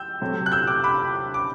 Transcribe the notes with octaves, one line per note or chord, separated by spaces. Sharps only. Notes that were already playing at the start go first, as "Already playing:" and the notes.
Already playing: E6 G6
C3 F#3 A3
F#6
E6 G6
D6 F#6
B5 D6
D6